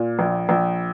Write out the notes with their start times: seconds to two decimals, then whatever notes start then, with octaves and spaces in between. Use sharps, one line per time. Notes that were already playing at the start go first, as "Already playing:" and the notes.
Already playing: A#2
0.19 A#1
0.49 A#1